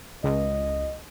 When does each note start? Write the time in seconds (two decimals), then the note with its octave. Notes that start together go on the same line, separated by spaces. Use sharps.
0.24 C#2 D#5